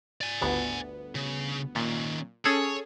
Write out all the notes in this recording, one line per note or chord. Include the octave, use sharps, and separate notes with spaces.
D5 G#5
G1 D2 B3
C#3
A#2 D#3 C#4
C#4 G#4 A4 C#5